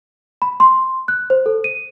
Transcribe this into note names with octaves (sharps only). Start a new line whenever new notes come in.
B5
C6
F#6
C5
A4
D#7